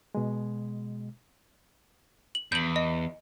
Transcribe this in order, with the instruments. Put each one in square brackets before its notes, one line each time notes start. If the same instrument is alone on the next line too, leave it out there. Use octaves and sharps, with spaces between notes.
[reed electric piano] B2 G#3
[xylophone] F#7
[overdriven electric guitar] E2 [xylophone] G6 F#7
[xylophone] D#5